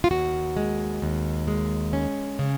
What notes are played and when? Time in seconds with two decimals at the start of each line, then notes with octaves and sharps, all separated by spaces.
0.04 F4
0.11 D#2 F#4
0.57 G#3
1.02 D#2
1.48 G#3
1.93 C#4
2.39 C#3